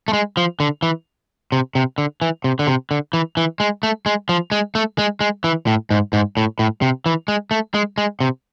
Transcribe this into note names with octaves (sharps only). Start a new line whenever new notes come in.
A3
G#3
F3
D3
E3
C3
C3
D3
E3
C3
D3
C3
D3
E3
E3
G#3
A3
G#3
F3
G#3
A3
G#3
G#3
E3
A2
G#2
G#2
A2
A2
C3
E3
G#3
A3
G#3
G#3
C3